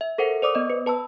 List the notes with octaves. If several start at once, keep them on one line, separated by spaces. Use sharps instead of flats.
E5
A4 A#4 C5 F#5
C5 D5 D6 D#6
B3 D#5
B4
B4 A5 B5 E6